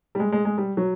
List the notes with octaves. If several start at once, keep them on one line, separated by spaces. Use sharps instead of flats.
G3
G#3
G#3
G#3
G3
F#3